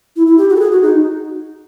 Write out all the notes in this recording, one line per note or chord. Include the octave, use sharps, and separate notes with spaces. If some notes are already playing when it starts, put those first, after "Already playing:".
E4
E4
G4
F#4
A4
G#4
F#4
D#4